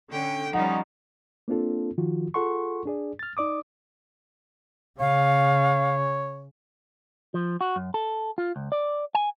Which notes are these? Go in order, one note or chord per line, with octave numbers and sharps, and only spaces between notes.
D3 C#4 G5
F3 G3 C#4 D#4 F#5
A#3 C4 D4 F4 A4
D#3 F3 F4 F#4
F4 G#4 A4 F#5 C6 C#6
D4 G#4 D5
F6 A6
D#4 D5 D6 D#6
C#3 C#5 F5
F3
F#4
F#2
A4
F4
C#2
D5
G#5